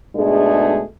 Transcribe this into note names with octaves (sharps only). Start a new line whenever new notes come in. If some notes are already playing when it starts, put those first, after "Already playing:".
G#2 B2 G#3 A3 D4 G#4